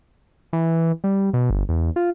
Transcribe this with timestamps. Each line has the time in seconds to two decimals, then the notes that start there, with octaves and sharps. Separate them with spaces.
0.53 E3
1.04 G3
1.33 B2
1.50 G1
1.69 E2
1.96 F4